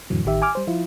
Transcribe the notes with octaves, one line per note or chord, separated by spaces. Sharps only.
F2 A2 D3 E3 F#3
A1 D#3 G4 E5
G#5 D6 F6
G3 C5
F3 E4 F4